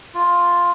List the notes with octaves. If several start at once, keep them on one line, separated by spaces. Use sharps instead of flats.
F4